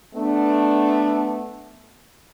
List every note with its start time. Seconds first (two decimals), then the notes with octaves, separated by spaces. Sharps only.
0.15 A3 B3 D4